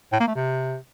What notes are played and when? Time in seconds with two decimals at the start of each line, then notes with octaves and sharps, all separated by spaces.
0.13 A2
0.20 A#3
0.28 A3
0.35 C3